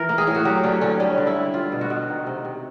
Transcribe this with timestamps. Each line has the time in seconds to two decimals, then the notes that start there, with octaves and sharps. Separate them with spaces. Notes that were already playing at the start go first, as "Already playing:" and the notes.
Already playing: E3 A#4
0.09 A#3
0.18 G#4
0.27 A2
0.35 F#4
0.45 F#3 G4
0.63 D3 C#4
0.81 D3 C#4
1.00 G3 C#4
1.18 D3
1.27 E4
1.36 D3
1.54 G3 F4
1.72 B2
1.81 F#4
1.90 B2
2.08 D#3
2.27 C3
2.45 C3